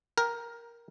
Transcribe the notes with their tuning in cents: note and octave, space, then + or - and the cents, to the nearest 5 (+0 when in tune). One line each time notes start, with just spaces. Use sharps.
A#4 +5 G5 +0